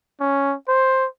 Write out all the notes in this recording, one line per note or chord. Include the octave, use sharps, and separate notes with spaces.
C#4
C5